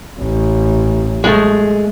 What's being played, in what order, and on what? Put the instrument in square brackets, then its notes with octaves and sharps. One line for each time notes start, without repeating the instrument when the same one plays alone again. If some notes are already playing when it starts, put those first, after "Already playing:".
[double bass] A1
[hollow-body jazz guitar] G#3 A3